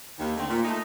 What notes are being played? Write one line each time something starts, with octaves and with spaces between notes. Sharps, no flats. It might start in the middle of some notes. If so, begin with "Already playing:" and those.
D#2
D3 A3 C4
A#2
A3 D#4